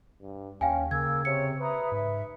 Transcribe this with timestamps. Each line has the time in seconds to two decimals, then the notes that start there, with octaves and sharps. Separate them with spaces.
0.21 G2
0.61 D#2 C#4 F5 G5 G#5
0.91 C#3 A#3 E6 G#6
1.25 C3 C#5 C#7
1.60 B4 E5 A#5 D#6
1.92 G#2 E5